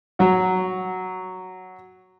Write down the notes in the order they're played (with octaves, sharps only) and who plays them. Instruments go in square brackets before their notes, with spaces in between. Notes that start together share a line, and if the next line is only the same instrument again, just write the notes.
[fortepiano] F#3 F#4